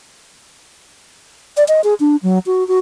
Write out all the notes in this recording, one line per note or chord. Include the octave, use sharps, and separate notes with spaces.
D5
D#5
G#4
D4
F#3
F#4
F#4